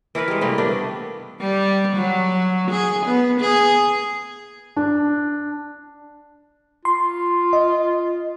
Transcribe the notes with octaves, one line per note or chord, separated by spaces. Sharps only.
E3 E4 A#4 B4
G3 G#3
C3 G3 A3 A#3
D#3 A3 B3 D4
G3
F#3
G#4
B3
G#4
D4
F4 C6
D#5